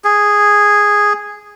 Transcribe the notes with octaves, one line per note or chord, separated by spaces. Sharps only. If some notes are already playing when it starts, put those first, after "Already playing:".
G#4